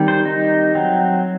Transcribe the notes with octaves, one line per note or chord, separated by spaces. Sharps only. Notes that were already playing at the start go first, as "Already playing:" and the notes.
Already playing: D#3 G3 C4
C5
D#4
F#3 C4